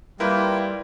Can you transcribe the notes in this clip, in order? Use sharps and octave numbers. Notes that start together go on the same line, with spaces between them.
G3 A#3 E4 F4 A#4 B4 G5